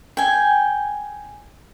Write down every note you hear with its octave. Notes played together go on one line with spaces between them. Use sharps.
G5 G#5